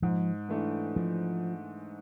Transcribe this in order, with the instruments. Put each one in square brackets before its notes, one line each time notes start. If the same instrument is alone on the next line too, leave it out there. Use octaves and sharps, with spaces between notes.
[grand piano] G#2 [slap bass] F3
[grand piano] E3 A3 D4
[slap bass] F3